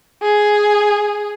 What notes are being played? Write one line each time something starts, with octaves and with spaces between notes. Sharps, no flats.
G#4